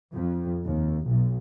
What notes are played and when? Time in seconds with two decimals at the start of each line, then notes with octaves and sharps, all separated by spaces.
0.13 F2
0.64 D#2
1.06 B1